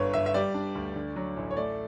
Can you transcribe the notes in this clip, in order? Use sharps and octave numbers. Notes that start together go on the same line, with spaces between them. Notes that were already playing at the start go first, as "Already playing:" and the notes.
Already playing: G1 D3 B4 C#5
G1 E5
E5
G3 D5
D4
D2
D3
F#3
A1
C#5
A3 D5